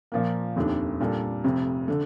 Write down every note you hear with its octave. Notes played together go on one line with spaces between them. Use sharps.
A#2 F3 A#3
F1 D#2 D#3 A3 D4
A#2 G3 D4 A4
F1 F2 C3
D3 A3